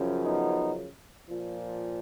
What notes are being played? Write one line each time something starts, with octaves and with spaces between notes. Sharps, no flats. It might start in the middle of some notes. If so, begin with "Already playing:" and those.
Already playing: F#2 C#3 F3
B3 D#4
A#2 F3